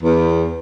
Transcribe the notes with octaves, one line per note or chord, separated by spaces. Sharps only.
E2